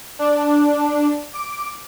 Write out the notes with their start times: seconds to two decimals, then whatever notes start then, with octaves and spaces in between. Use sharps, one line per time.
0.19 D4
1.33 D6